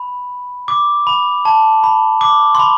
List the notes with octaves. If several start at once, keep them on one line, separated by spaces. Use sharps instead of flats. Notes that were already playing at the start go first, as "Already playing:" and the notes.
Already playing: B5
D6
B5
A5
B5
D6
C6
B5